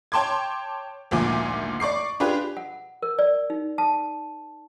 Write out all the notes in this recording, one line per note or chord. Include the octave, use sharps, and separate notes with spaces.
C#5 G5 A5 C6 D6 G#6
G#1 D2 A#2 F3 G#5 D6
D5 C#6 D6 C7
D4 F4 G4 G#4 B4
F#5
A#4
D5
D#4
A5